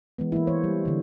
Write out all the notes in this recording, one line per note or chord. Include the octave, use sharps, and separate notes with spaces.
E3 G#3 B3
E3 A#3 E4
E3 C5 C#5
G3
D3 E3